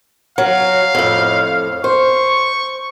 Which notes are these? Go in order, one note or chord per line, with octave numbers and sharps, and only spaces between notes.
F#3 F5
F2 A2
C5 C#6